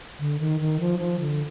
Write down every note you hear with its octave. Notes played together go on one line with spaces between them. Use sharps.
D3
D#3
D#3
F3
F3
D3